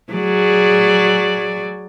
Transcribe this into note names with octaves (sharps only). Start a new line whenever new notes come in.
F#3 G#4 D5